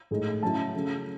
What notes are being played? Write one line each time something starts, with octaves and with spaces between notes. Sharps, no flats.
A2 G#3 D#4
C#3 F#3 C#4 E4 A5
C#3 F#3 A3